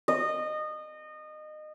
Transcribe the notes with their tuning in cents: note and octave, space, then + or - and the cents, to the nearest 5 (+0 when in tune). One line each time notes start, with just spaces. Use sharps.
D#5 -25